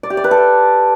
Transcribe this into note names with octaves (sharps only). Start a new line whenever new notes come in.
D5
G4
D5
B4
A4